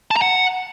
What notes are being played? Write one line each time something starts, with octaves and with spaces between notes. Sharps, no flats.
A5
A#5
F#5